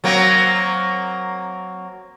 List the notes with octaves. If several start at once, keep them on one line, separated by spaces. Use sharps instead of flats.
F#3 A#3 C4